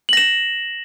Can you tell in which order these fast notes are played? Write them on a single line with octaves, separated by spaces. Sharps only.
F#7 A#6 E7